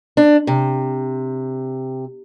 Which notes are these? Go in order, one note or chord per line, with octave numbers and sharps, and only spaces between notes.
D4
C3